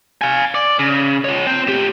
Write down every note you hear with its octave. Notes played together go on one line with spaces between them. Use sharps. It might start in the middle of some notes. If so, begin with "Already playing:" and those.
F5 G#5
D5
C#3
F4 C#5
C4 G5
A2 G4